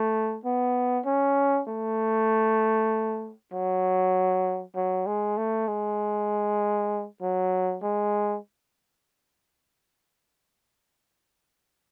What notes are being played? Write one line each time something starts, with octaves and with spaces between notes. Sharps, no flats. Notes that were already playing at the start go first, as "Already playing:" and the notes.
Already playing: A3
B3
C#4
A3
F#3
F#3
G#3
A3
G#3
F#3
G#3